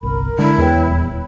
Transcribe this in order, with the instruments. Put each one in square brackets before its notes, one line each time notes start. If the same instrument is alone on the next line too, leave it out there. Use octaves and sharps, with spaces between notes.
[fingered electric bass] G1 C2 [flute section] A#4 B5
[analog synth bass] D3 [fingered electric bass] G#3 [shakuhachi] E4
[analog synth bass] E2 [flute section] B4 C#5 G5
[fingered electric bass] D#1 [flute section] B5